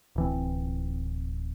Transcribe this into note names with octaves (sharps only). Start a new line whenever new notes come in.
D1 E3 C4